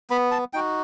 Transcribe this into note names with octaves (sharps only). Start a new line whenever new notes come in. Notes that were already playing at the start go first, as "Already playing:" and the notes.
B3 B5
A5
D#4 F#4 G5